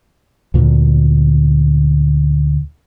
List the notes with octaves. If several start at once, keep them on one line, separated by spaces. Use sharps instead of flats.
D2 A#2 D3